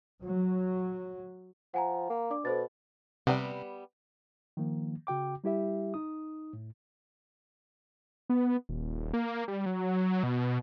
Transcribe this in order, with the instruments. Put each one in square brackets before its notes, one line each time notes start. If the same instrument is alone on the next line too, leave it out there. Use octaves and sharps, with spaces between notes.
[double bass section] F#3
[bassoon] F3 [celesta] F#5 G#5 A#5
[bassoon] A#3
[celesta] D4 D5 D6
[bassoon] B2 [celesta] A4 C5 A6
[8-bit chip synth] C3 [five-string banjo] G3 B3
[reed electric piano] D#3 F3 A#3
C#3 F#4 G5 D6
G3 E4 G4 E5
D#4 D#6
A2
[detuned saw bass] B3
D#1
A#3
G3
F#3
B2